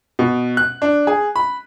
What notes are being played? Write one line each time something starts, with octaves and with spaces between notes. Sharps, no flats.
B2
F#6
D4
G#4
B5